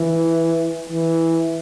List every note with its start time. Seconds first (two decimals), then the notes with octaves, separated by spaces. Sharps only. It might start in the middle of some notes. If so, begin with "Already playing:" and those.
Already playing: E3
0.90 E3